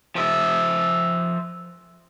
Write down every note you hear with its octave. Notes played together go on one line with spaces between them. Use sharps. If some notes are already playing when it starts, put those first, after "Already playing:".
F3 E5